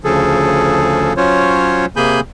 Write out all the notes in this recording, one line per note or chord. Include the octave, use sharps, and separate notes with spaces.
D2 C#3 F3 G#4 A4
F#3 C#4 F4 C5 C#5
C3 A#3 G#4 G#5 B5 G6